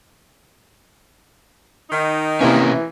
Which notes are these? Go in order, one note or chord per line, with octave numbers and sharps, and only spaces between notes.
D#3 D#4
C3 E3 A#3 C#4 E4 G#5